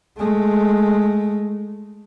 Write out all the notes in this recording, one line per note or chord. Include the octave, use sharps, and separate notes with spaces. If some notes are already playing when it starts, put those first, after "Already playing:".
G#3 A3